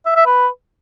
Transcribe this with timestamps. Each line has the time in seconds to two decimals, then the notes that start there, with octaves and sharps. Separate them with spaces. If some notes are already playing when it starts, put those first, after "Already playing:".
0.06 E5
0.16 E5
0.26 B4